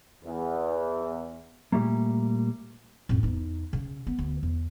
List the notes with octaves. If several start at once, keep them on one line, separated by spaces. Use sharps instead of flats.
E2
A#2 G3 A3 A#3
F2 A2
E2 D#4
C#3
B3
D2
E2